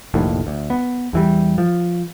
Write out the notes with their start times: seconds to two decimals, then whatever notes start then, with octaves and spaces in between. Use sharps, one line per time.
0.14 F1 A#1 D#2 A2
0.47 D2
0.70 B3
1.13 E2 E3 G3
1.58 F3